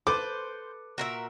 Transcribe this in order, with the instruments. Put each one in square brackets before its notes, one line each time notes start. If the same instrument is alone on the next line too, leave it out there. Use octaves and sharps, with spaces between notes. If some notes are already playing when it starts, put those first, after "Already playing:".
[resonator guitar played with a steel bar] A4 B4 [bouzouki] C5 [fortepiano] D6
[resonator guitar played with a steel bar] A#2 [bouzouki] F#4 A#4 E5